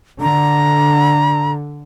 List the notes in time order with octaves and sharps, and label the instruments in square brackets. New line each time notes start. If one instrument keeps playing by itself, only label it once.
[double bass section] D3 [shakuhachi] A#5